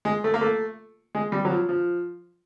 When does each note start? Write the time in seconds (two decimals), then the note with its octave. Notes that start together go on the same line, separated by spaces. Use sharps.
0.05 G#3
0.24 A3
0.34 A#3
0.41 A3
1.15 G#3
1.32 G3
1.45 F#3
1.50 F3
1.69 F3